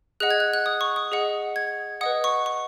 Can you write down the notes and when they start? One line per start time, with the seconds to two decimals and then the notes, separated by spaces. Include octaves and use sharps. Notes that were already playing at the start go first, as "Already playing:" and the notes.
0.20 G#4 D#5 F#5 F#6
0.30 G#6
0.40 F#6
0.54 F#6
0.66 D#6
0.81 C#6
0.96 D#6
1.12 G#4 D#5 F#5
1.56 G#6
2.01 B4 D#5 F#5 D#6
2.24 C#6
2.46 C#6